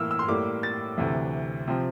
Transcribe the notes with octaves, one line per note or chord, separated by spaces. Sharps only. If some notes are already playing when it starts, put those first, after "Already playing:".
Already playing: A2 E3 A#3 E6 F6
E6
C6
A2 G3 A#3 D6
A6
D2 C3 E3
C3 F3 C4